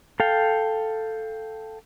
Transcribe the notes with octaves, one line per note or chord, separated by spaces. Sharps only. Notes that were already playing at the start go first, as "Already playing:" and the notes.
A4 F5 G5